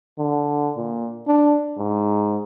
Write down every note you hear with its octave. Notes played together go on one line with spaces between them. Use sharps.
D3
A#2
D4
G#2